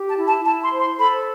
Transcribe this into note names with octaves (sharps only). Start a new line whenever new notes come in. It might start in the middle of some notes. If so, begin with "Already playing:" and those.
Already playing: G4
A5
E4
A5
E4 A5
C6
C5
C6
A4 B5